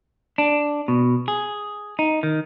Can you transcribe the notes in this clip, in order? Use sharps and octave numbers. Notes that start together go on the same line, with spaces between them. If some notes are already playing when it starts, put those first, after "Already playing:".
D4
B2
G#4
D#4
D#3